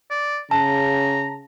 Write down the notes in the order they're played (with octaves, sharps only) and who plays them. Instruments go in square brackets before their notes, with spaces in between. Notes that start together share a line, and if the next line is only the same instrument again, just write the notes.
[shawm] D5
[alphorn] C#3 [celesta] A5 [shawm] A#5